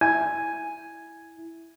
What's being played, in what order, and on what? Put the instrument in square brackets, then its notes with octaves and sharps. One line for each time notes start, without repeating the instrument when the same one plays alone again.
[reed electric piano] E4 [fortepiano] G#5